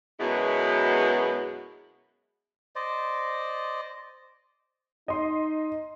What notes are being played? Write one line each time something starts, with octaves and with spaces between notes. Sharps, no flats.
F#2 B2 G#3 B3 E4 F#4
C5 D5 D#5
D#4 D#5 C6